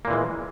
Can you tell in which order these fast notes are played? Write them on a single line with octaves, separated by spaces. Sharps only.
A#3 A#2 E3 G#3